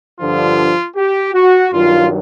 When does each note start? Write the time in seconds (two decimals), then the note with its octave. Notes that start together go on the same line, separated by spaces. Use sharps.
0.19 G2 D3 F3 F4
0.97 G4
1.35 F#4
1.73 G2 D#3 F#3 F4